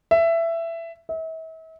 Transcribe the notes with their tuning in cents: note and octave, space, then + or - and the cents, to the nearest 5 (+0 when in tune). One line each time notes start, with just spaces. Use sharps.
E5 +15
E5 -40